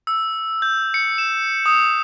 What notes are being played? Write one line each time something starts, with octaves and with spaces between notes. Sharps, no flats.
E6
G6
C#7
E7
D#6